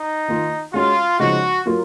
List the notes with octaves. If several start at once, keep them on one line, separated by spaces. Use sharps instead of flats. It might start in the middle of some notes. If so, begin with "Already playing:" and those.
Already playing: D#4
D#3 A#3 F4
G#3 C#4 F4 F#4
C#3 F3 G#3 D#4 F#4
F#3 A#3 F4 A#4